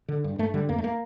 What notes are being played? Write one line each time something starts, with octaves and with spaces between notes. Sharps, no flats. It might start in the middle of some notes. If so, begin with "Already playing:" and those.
D3
G2
G2 A3
D3 G3
F2 A#3
A3
A#3